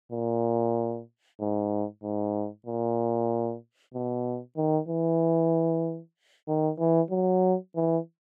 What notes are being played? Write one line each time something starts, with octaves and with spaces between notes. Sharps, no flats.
A#2
G#2
G#2
A#2
B2
D#3
E3
D#3
E3
F#3
E3